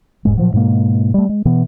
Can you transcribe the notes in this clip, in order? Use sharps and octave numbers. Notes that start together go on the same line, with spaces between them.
D#1 G#2 G#3
A#2 F3 F#3
G#2 B2 G#3 A#3
G3 A3
G#3
B2 E3 B3